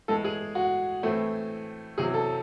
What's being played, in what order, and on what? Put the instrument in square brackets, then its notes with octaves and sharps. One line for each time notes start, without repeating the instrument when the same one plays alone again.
[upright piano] A2 E3 G#3 A4
G#4
F#4
A2 E3 A3 C4
E2 C3 F#3 C4 G#4
A4